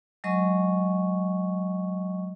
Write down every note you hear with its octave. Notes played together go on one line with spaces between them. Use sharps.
F#3 G#3 D#5 C#6